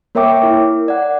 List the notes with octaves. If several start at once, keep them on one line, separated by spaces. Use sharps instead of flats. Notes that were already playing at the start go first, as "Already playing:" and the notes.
A#3 A#4 C#5 E5 G5 D6
E4 A#4
D5 F#5